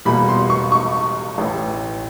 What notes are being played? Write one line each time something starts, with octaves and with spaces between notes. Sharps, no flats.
E2 B2 G3 A#3 B5
C6
C#6
C#6
A1 A2 E3